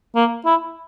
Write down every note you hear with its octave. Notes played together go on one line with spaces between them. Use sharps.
A#3
E4